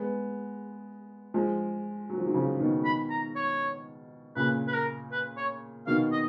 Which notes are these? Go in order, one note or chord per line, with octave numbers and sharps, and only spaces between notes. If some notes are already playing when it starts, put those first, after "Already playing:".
Already playing: G#3 B3
F3 G#3
F#3
F3
D#3 F#3
C#3 F3
B2 D#3
B5
A#5
C#5
A#2 C#3 B4
B4
A#4
B4
C#5
B2 D#3 F5
D#5